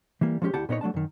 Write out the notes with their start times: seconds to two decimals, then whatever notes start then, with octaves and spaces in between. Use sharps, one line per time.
0.21 E3 G3 A#3
0.42 F3 G#3 C#4 F4 G4
0.54 D2 E4 G4 F#5 A5
0.69 A#2 B3 D#4 C#5
0.81 F#3 A3 D4 A5
0.94 F#2 D#3